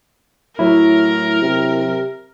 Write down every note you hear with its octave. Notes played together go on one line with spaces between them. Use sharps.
A2 F#3 E4 A#4
C3